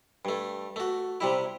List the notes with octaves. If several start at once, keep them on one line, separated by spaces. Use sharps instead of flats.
G2 A3
A3 F#4
C3 G3 E4